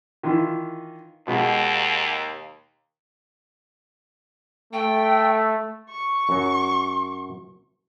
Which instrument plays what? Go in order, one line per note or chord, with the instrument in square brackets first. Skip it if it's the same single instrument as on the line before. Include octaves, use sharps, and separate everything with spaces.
[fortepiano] D#3 E3 F4
[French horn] D#2 [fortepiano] B2 G#3
[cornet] A3 [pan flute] G5
[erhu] C#6
[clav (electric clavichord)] F#2 F#3